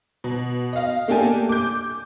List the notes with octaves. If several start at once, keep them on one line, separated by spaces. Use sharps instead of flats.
B2
D#5 F5
A3 A#3 D4 G4 A4 G#5
D6 G6